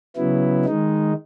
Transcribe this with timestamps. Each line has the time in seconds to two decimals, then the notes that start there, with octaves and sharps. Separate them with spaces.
0.17 C#3 F#3 B3 E4
0.65 D#3 G#3 D#4